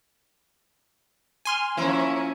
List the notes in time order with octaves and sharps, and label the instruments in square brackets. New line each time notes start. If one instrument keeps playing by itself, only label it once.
[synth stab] G#5 C6 F6
[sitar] F3 A#3 E4 [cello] C#4